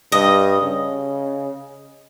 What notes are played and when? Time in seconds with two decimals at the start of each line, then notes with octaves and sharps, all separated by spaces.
0.12 G2 D#5
0.62 C#3